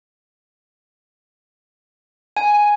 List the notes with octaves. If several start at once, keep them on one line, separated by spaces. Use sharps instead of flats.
G#5